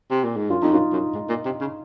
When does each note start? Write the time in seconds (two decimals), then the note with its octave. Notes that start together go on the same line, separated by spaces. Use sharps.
0.11 C3
0.24 A#2
0.37 G#2
0.50 F#2 F4
0.62 F2 D#4
0.71 F#2
0.75 F4
0.92 F#2
1.14 G#2
1.29 A#2
1.45 C3
1.61 C#3